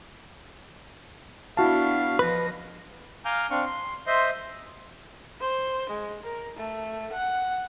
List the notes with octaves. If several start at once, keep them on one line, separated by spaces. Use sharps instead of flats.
B3 D4 E4 F#4 F5 A5
F3 B4 D#5
F5 G#5 A#5 D6 F6 G6
C4 D4 F5 C#6
C6
C5 D#5 E5 C6
C5
G#3
A#4
A3
F#5